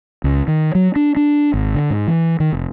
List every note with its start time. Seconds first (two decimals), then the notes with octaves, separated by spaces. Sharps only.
0.24 C#2
0.48 D#3
0.75 F#3
0.96 D4
1.17 D4
1.54 G#1
1.75 D3
1.90 G#2
2.08 E3
2.40 D#3
2.53 F1